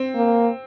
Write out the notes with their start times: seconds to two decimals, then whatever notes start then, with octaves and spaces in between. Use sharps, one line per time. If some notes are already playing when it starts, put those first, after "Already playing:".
Already playing: C4
0.15 A#3